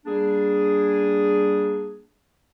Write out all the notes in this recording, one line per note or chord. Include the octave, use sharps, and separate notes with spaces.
G3 A#3 D4 G#4